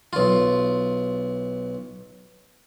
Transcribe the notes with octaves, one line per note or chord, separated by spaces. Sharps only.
B1 F4